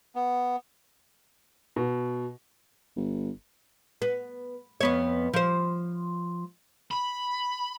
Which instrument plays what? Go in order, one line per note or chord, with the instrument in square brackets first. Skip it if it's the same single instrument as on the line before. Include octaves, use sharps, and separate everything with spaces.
[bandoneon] B3
[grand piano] B2
[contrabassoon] G1
[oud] B3
F2 B3 C#5
F3 C5
[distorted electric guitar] B5